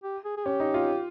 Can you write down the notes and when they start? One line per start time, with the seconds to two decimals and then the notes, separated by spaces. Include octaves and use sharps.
0.03 G4
0.25 G#4
0.37 G#4
0.45 C#4 G4
0.60 D#4
0.74 F4